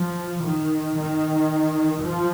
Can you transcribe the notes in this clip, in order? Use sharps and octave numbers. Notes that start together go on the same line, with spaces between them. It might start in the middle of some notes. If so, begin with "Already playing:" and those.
Already playing: F3
D#3
D#3
F3